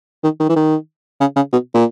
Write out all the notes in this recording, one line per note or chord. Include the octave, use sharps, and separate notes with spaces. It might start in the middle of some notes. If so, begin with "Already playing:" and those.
D#3
D#3
E3
D#3
C#3
C#3
B2
A#2